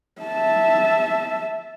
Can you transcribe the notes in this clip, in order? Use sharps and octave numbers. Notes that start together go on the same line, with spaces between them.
E5 A5